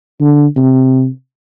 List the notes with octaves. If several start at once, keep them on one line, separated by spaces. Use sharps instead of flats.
D3
C3